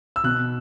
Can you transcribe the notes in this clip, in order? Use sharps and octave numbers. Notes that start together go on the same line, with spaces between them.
E6
B2 F#6